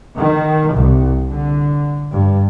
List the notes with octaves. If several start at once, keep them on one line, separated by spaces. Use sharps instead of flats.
D#3
C2
D3
G2